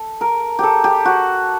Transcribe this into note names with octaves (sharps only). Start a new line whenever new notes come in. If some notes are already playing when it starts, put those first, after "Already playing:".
Already playing: A4
A#4
G4 A4
G4
F#4